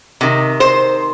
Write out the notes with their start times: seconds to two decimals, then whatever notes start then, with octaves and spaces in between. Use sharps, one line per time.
0.21 C3 D#3
0.60 C5